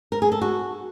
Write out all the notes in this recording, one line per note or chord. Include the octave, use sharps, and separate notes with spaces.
A#4
G#4
A4
F#4